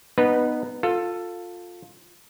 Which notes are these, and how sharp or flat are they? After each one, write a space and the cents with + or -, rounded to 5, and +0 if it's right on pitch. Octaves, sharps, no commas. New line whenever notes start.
B3 +0 D#4 -20 B4 -15
F4 +15 A4 +15